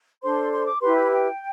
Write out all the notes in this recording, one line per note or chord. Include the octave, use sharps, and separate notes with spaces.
D4 A4 C5 C6
C6
D6
E4 G4 B4 C6
B5
G5